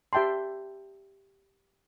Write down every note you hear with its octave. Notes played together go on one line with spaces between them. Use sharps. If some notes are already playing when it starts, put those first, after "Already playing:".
G4 E5 G5 A5 C6